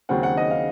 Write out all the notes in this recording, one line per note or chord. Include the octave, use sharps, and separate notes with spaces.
D#2 C#3 F#3 C4 F#5
F#5
D#5
F5